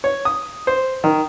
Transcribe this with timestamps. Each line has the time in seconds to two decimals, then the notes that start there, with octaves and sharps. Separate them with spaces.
0.04 C#5
0.25 D#6
0.67 C5
1.04 D#3